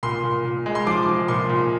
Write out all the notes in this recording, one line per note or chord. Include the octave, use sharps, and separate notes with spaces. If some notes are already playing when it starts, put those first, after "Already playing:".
A#2 C6
A#2
A#2
G#3
C6
F3 D6
F3
A#2 C6
A#2